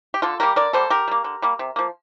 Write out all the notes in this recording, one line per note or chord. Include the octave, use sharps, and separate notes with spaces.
G4
D3 F4 A4
G3 A#3 G4 A#4
D3 A#4 D5
G3 A#3 A4 C5
D3 G4 A#4
G3 A#3
D3
G3 A#3
C3
F3 A#3